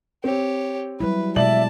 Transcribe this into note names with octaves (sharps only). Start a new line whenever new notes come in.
C4 G4 C#5
F#3 G3 E4 B4
B2 G#3 D5 E5 A5 F#7